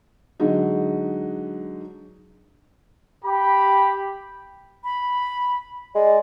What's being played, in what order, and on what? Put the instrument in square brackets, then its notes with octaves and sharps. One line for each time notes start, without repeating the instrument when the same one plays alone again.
[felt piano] D3 F#3 G#3 D#4
[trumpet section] G4 B5
[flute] B5
[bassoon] G#3 [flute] D5